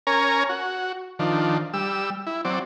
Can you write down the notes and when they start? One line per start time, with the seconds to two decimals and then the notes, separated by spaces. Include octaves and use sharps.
0.07 C#4 A#4 C#5 G#5 A#5
0.49 F#4
1.19 D#3 F3 D4
1.73 G3 E6
2.27 E4
2.45 F#3 C4 D5